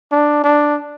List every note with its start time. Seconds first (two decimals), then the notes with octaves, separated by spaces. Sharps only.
0.12 D4
0.44 D4